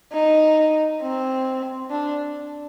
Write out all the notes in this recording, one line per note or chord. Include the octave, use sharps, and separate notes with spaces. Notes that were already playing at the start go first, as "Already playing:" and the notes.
D#4
C4
D4